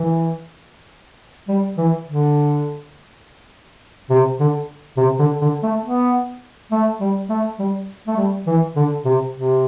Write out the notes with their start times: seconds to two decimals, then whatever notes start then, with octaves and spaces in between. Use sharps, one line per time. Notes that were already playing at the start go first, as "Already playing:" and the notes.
Already playing: E3
1.48 G3
1.78 E3
2.07 D3
4.10 C3
4.40 D3
4.97 C3
5.19 D3
5.41 D3
5.63 A3
5.85 B3
6.72 A3
7.00 G3
7.29 A3
7.59 G3
8.07 A3
8.17 G3
8.47 E3
8.76 D3
9.05 C3
9.33 C3